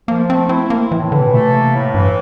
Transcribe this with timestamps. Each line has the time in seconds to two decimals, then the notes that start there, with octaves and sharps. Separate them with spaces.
0.08 F3 A#3
0.29 A3 C4
0.49 C4 E4
0.70 A#3 C4
0.91 A2 E3
1.12 D3 E3
1.20 C3
1.27 A#2
1.33 C3 A3
1.53 A#3
1.74 A2
1.94 G2 E3